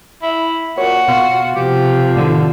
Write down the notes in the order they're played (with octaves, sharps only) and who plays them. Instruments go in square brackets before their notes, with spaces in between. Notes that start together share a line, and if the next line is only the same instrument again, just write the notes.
[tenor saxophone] E4
[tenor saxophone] A#2 [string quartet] F#4 [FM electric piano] C#5
[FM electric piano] B2 F5 [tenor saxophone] F4
[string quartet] C3 F3 [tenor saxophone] G4
[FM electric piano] A2 D#3 [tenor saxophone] D3